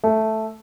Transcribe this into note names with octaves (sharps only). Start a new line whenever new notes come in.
A3